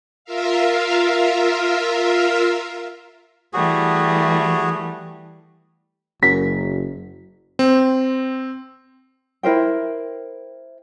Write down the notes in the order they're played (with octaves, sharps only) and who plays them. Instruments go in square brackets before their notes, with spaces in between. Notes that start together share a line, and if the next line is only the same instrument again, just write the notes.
[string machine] F4 A#4 E5 F5
[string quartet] E3 G3 A3 [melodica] F#4 G#4
[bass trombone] F#1 [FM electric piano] C#4 F#4 A#4 [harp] B6
[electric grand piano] C4
[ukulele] E4 A#4 C5 G5